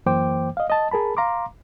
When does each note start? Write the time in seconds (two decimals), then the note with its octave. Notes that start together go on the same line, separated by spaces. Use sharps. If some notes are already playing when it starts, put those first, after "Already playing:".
0.06 F#2 E3 A#3 C5 G5 D6
0.57 D#5 F5
0.70 D#5 A5
0.91 G#4 A#4 A5 B5
1.17 F5 A#5 C6 D6